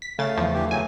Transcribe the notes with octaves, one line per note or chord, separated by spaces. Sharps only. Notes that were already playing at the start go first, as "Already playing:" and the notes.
B6
C#3 A3 F5 A6
E2 F3
D3 E3 G4
F#2 C#3 F#3 G#5